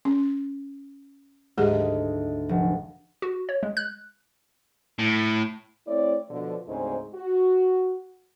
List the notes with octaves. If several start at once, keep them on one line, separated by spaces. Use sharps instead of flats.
C#4
D2 G#2 G#3 G4 G#4 D#5
F1
F#4
C#5
G#3
F#6
A2
A3 C4 E4 C#5 D5
B2 D3 F3
D2 G#2 C#3 G#3 C4 D#4
F#4